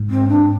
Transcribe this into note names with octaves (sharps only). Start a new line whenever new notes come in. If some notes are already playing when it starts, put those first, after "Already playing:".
Already playing: G#2
C4
D4